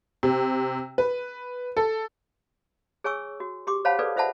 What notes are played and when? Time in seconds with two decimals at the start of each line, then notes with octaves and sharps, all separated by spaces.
0.23 C3
0.98 B4
1.77 A4
3.04 G#4 C#5 G#5 C#6 E6
3.40 F#4
3.67 G4 C6 D6
3.85 C5 C#5 F5 F#5 A5 B5
3.99 G#4 A4 B4 D5
4.16 F4 C5 E5 F#5 A5 B5